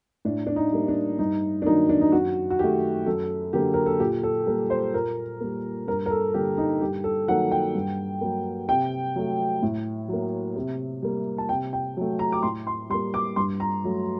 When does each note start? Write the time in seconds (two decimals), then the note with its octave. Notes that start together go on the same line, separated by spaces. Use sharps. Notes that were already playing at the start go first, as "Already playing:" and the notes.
0.25 A2 D4
0.47 D4
0.56 D#4
0.72 G3 A#3
0.88 D4
1.19 G2 D#4
1.62 D4
1.66 D#3 F#3 A#3 D#4
1.89 D4
2.01 D#4
2.12 F#2 F#4
2.50 F#4
2.59 D#3 A3 G4
3.06 F#2 A4
3.53 D3 F#3 A#3 G4
3.74 A#4
3.86 A4
4.00 A#2 G4
4.23 A4
4.47 G3 A#3 A#4
4.70 C5
4.94 A#2 A#4
5.40 G3 A#3
5.88 G2 A#4
6.06 A#4
6.10 A4
6.34 D3 G3 A#3 G4
6.58 D#4
6.81 G2 G4
7.04 A4
7.28 D#3 F#3 A#3 F#5
7.52 G5
7.75 G2
8.21 F#3 A#3
8.68 C3 G5
9.16 F#3 A3
9.62 A2
10.08 F#3 A#3
10.56 C3
11.02 G3 A#3
11.38 A5
11.49 C3 G5
11.73 G5
11.97 F#3 A3
12.19 A#5
12.32 D6
12.43 A2 C6
12.67 C6
12.90 G3 C6
12.94 A#3
13.14 D6
13.36 G2 C6
13.60 A#5
13.84 F#3 A3